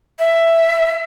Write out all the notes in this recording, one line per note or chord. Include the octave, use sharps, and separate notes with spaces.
E5